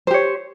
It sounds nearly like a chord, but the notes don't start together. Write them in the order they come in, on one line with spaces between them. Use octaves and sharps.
C5 G4 C#5